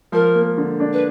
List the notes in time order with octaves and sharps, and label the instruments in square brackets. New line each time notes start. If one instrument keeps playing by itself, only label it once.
[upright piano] F3 [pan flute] A#4
[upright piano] A#3
D3
D4
[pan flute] B4